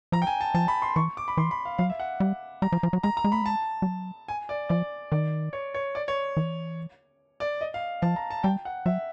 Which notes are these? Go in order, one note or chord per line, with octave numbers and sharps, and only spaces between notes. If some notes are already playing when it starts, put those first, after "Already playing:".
F3 A#5
G5
G#5
A5
F3 A5
B5
C6
E3 C#6
D6
B5
E3 C6
B5
F5
F#3 F5
E5
F#5
G3
G3 A#5
F3
F3
F#3
G#3 A#5
A#5
G#3
A3 B5
G#3 A5
G3
F#3
G#5
D5
F3 D5
D#3 D5
C#5
C#5
D5
C#5
E3
D5
D#5
F5
F3 A5
A#5
A5
G3 G5
F#5
F#3 E5